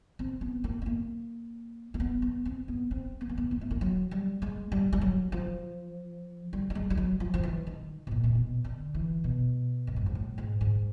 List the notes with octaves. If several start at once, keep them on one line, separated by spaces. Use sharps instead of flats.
C4
B3
A#3
B3
A#3
A#3
B3
B3
C4
B3
C4
B3
A#3
B3
A#3
A3
A#3
F#3
G3
G#3
G3
G3
F#3
F3
G3
G3
G#3
G3
F#3
F3
F3
E3
D#3
B2
A#2
C3
B2
D3
E3
B2
F#2
G2
G#2
A2
G#2
G#2